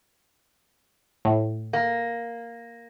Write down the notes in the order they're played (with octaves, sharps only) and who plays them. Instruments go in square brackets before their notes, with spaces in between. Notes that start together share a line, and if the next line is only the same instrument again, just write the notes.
[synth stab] A2
[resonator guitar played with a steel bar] A#3